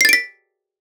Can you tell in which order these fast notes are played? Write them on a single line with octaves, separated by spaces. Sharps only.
C7 A6 D7 B6